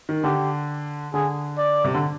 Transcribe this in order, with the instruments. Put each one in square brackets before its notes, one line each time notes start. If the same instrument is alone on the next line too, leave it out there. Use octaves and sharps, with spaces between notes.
[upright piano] D#3
[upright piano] D3 [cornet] G4
[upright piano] D3 [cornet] G#4
[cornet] D5
[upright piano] C3
D3